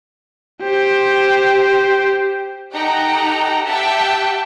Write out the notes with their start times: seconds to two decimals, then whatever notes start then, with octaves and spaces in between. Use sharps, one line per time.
0.63 G4 C5
2.73 D#4 G4 A4 F#5 G5 A#5
3.65 G4 E5 F#5 G5 A5